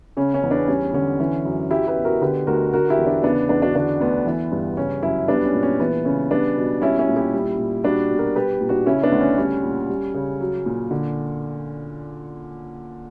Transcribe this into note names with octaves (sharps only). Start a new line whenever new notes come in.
C#3 C#4
C#4
E2
B3 D4
G3 C#4
D3 C#4
E3 C#4
F#2
F#3 E4 G4
G4 B4
B2
F#4 A#4
D3 G4 B4
D2 F#4 A#4
D3 F#4 A#4
E4 G4
E2
D4 F#4
C#3 B3 D4
E2 B3 D4
D4 F#4
D3 D4 F#4
D2 B3
E3
G2
C#3 C#4
F#2 C#4 E4
G3 B3 D4
C#4
A#2
C#4
E3 B3
C#3 C#4
G3 B3 D4
B2
G3 C#4 E4
C#4 E4
A#2
E4 G4
G3
A#2
G3 D4 F#4
B2
F#4 A#4
G3 G4 B4
A#2
D4 F#4
C#3 C#4 E4
B3 D4
D2
C#4
G3 C#4
A#2
G3
C#3
F#3
A#2
D3